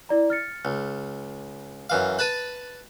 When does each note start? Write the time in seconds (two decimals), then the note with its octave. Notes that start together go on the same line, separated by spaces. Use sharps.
0.09 E4 D5 A#5
0.30 F6 A6 C#7
0.65 C#2
1.90 F#2 E3 F5
2.19 B4 A5 B5 F#6 A6 D#7